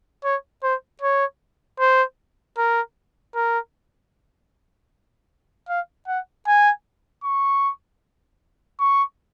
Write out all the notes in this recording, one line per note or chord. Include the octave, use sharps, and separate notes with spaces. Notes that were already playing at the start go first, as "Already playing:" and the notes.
C#5
C5
C#5
C5
A#4
A#4
F5
F#5
G#5
C#6
C#6